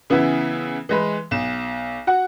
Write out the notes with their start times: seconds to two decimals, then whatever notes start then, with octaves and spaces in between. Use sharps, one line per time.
0.10 C#3 E3 B3 E4
0.89 E3 G#3 B4
1.31 B1 E7
2.07 F#4 F#5